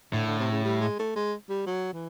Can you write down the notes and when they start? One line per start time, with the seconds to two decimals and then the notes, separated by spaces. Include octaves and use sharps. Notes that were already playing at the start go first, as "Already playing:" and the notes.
0.12 A2 D3
0.26 D3
0.39 C3
0.51 C#3
0.65 G3
0.81 G#3
0.99 A3
1.15 G#3
1.49 G3
1.67 F#3
1.93 E3